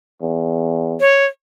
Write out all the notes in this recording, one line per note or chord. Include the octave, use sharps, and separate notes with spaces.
E2
C#5